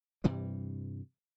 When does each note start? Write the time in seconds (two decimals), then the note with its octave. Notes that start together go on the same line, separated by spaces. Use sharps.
0.24 G2 C3 E3 G3